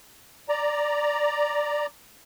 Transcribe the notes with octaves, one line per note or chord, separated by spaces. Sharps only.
D5 A#5